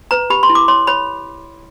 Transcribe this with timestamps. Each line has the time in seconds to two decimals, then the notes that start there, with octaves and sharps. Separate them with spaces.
0.11 B4 A#5
0.30 G4 B5
0.43 C6
0.49 E4
0.55 D6
0.68 C#5 C6
0.87 C#5 B5